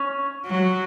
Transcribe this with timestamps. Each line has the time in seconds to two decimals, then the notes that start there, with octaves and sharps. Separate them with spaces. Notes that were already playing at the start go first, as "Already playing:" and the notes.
Already playing: C#4
0.46 F#3